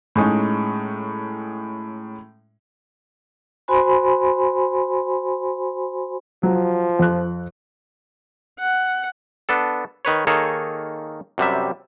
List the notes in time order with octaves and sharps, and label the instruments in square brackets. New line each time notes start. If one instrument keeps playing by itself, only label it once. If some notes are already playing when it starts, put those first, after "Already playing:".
[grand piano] A2 G#3 C#4 D#4
[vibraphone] F#4 C5 G#5 B5 C6
[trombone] F3 [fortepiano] F#3
[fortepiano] F2 F#6
[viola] F#5
[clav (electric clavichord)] B3 D4 A4
D#3 B4 C#5
D#3 A#3 G#4 A4 C#5
F#2 C3 G3 E5